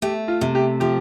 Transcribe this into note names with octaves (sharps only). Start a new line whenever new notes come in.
A3 G4
F4
C3
G4
F3 G4